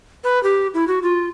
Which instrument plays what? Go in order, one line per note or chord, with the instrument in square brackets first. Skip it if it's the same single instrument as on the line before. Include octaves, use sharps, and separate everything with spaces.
[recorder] B4
G4
E4
F#4
F4